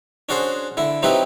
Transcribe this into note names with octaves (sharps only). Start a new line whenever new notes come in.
C#4 D4 F#4 G#4 C5
D3 E4
F#3 C4 D#4 E4 G4 B4